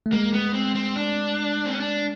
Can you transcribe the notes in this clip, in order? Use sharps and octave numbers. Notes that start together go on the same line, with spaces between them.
A3
G#3 A#3
B3
C4
C4
D4
C4
C#4
D4